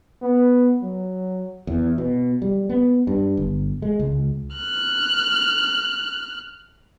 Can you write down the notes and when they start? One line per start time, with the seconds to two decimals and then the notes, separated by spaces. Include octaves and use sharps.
0.22 B3
0.82 F#3
1.67 E2
1.98 B2
2.42 G3
2.69 B3
3.07 G2
3.37 G1
3.82 G#3
3.99 C#2
4.56 F6 F#6